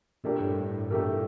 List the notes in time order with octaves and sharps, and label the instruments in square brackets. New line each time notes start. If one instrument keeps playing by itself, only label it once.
[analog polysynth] A#2 [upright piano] A3 D4 G4 A#4
[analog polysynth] A2
G2
A2
[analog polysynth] A#2 [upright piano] A3 D4 G4 A#4